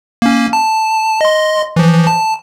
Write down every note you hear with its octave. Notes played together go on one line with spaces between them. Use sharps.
A#3 C#4
A5
D#5 C6
E3 F3
A5